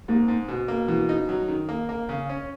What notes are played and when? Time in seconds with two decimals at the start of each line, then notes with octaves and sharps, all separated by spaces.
0.08 G#2 A#3
0.28 G#2
0.48 B2
0.68 A#3
0.88 B2 E3
1.09 D#4
1.29 F#3
1.48 D#3
1.69 A#3
1.89 A#3
2.09 C#3
2.29 C#4